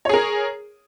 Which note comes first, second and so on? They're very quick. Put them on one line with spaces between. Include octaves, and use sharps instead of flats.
C#5 G#4 A#4